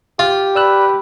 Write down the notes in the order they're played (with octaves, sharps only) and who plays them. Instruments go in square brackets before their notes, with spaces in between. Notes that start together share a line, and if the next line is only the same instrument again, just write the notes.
[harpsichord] F4 [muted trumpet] G4
[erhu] B4 [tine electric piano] D5 E6 F#6